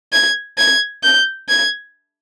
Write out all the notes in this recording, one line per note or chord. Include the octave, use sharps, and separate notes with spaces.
G#6
G#6
G6
G#6